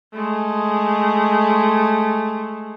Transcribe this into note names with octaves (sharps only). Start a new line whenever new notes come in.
G#3 A3